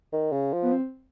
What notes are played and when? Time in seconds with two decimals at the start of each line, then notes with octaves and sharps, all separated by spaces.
0.13 D#3
0.32 C#3
0.53 F3
0.62 B3
0.72 C4